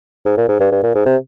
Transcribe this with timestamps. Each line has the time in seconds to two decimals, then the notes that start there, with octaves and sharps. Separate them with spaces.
0.25 G#2
0.37 A#2
0.48 G#2
0.60 G2
0.72 G2
0.83 A#2
0.95 G#2
1.06 C3